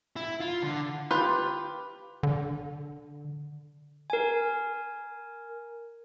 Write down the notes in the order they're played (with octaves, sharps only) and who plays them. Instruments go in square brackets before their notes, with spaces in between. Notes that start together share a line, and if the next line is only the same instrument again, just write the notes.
[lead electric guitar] E4
F4
D3
[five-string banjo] F4 G4 B4
[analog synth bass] D3
[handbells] A#4 G#5